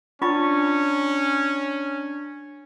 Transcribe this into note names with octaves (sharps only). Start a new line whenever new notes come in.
C#4 D4 F4 B5 C#6 A6